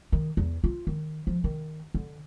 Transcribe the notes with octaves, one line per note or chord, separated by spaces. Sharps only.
D#3
E2
F4
D#3
F3
D#3
D3